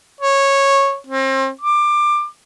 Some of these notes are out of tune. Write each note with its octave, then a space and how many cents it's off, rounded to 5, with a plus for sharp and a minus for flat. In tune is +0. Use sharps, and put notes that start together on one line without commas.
C#5 -10
C4 +35
D6 +20